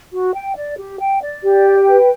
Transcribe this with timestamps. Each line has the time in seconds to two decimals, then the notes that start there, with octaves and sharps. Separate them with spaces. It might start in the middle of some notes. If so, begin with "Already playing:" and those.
0.12 F#4
0.33 G5
0.56 D5
0.78 G4
1.00 G5
1.22 D5
1.44 G4
1.66 G5
1.88 B4